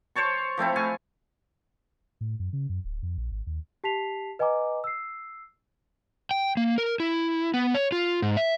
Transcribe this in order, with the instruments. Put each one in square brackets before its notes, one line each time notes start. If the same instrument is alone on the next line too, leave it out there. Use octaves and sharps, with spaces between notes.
[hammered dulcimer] C5 C#5 A5 C#6
F3 A3 C4 E4
F5 G#5 A5 C#6
[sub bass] A2
F#2
C#3
F#2
D1
F2
A#1
G#1
D#2
[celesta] G4 A5 B6 C7 F7
B4 D#5 F#5 G#5 A#5 D6
E6 C7
[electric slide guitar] G5
A#3
A#4
E4
B3
C#5
F4
G#2
E5